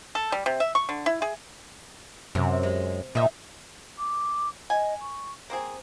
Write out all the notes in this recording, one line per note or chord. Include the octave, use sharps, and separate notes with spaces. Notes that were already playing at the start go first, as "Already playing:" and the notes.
A4
G3
C3
E5
C#6
D3
E4
G#4
F#2 C3
G#3
A#2 D#4 E5
D6
D#5 G#5
C#6
A#3 C4 G#4 C5